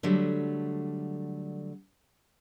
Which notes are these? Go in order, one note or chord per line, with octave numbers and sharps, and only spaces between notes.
D3 F#3 G3 A3